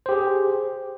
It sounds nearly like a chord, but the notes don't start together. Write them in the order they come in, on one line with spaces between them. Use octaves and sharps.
C5 G4 G#4